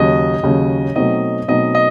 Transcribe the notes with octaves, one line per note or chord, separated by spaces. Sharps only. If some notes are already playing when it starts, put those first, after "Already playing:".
Already playing: D#2 C#3 F#3 D#5
D#2 C#3 F#3
B2 F#3 A3 C4 D#4 D#5
B2 F#3 A3 C4 D#4 D#5
D#5